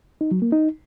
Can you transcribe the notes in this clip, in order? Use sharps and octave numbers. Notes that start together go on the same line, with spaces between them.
D#4
F#3
A#3
D#4